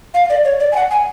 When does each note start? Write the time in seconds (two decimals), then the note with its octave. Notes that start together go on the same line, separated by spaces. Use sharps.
0.14 F5
0.30 D5
0.45 C#5
0.60 D5
0.72 G#5
0.76 F#5
0.91 G#5